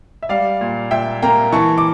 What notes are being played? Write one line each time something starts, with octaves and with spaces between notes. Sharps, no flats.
E5
G3 D5 F5
A#2
A#2 E5 G5
A#3 G5 A#5
E3 A5 C#6
D6